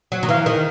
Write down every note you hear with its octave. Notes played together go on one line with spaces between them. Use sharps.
F#3
D#3
E3 F5
D#3